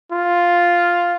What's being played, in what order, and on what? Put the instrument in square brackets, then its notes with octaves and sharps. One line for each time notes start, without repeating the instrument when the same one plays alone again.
[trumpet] F4